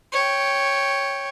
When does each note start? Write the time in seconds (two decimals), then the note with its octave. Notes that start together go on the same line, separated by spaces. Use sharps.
0.13 C#5 G5